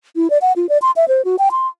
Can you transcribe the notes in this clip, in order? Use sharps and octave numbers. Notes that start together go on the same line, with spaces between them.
E4
D5
F#5
F4
D5
C6
E5
C5
F#4
G5
C6